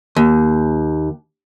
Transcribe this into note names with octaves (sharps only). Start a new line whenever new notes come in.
D#2